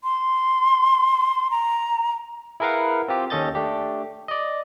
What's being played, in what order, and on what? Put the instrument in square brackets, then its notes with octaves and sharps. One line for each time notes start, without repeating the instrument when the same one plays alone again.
[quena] C6
A#5
[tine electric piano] E4 G#4 A#4 B4 F5 F#5
C4 F4 G4
D#2 C#4 A4 D#5 G6 A6
A3 D4 G4
D5 D#5